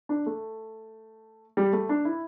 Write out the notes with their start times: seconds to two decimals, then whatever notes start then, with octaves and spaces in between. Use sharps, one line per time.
0.09 D4
0.26 A3
1.57 G3
1.73 A3
1.89 D4
2.05 E4